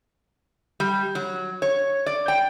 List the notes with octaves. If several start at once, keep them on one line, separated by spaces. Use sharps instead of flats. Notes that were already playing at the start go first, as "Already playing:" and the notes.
G3
F#3
C#5
D5
G5